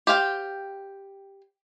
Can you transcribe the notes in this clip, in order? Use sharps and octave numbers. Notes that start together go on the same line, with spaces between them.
G4 C5 F5 G5